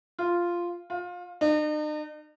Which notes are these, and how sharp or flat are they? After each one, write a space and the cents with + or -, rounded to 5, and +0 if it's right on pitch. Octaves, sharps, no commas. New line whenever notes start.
F4 -5
F4 +25
D#4 -45